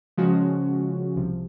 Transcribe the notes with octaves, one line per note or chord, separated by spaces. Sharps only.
C#3 F3 G#3 C#4 F#4
C2 C3 F3